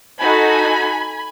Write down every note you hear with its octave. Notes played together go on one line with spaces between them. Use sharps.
D#4 F#4 A4 G#5 B5